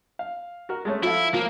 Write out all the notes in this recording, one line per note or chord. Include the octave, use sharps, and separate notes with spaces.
F5
F#4 A#4
G#3 A3 C#4
F3 E4 A4 F5
F3 F#3 A#3